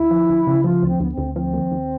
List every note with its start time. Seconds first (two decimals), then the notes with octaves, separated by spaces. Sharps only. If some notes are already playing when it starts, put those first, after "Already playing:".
Already playing: D2 E4
0.11 F3
0.29 D2
0.47 C#3
0.64 F3 F4
0.83 D2
0.88 C4
1.00 D2 B3
1.12 C4
1.18 D2
1.35 F3 C4
1.53 D#2
1.71 D#2